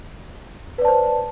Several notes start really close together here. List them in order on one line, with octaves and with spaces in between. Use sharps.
B4 D5 A5 C5